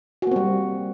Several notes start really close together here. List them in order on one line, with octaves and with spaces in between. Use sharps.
F#4 A#3 C4 G3